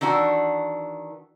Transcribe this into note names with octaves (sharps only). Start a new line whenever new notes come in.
D#3 E3 D4 F#4